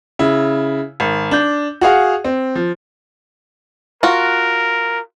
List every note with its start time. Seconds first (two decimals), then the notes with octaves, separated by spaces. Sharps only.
0.19 C#3 E4
1.00 G#1
1.31 D4 G6
1.81 F#4 G#4 F5 F#5
2.24 C4
2.55 F3
4.03 F4 F#4 A#4